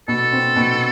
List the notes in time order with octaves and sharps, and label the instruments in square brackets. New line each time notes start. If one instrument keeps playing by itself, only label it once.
[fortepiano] B2 [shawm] A4
[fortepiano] C4
B2